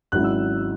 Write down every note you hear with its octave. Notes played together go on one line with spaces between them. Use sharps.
G#1 G#2 F#3 C#4 E4 F#6
E6